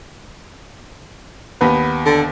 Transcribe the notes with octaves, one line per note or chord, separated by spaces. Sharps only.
D#2 B3 B4
D3